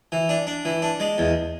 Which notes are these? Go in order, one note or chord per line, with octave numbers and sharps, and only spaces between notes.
E3
D4
D4
E3
D4
G#3
E2